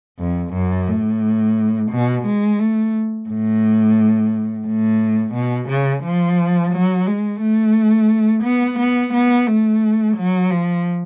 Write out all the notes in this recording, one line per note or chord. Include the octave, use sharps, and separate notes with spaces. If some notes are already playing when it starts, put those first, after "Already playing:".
F2
F#2
A2
B2
G#3
A3
A2
A2
B2
C#3
F3
F#3
G#3
A3
B3
B3
B3
A3
F#3
F3